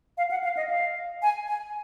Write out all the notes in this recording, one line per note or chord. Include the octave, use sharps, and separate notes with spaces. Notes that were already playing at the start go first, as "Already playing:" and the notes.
F5
F#5
F5
D#5
F5
G#5
G#5